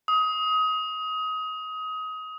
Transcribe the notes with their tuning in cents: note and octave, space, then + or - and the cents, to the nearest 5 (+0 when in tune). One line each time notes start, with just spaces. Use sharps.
D#6 +25